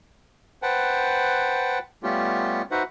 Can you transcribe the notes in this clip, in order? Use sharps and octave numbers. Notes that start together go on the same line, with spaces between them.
B4 C5 F#5 G5 A5
G3 A3 B3 C#4 F4 G4
D#4 F#4 B4 C5 E5 F#5